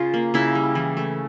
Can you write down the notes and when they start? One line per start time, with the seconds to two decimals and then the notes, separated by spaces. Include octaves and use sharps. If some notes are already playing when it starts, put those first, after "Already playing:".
Already playing: C#3 F4
0.14 A#3
0.34 C#3 E4
0.55 G3
0.75 E3
0.97 A3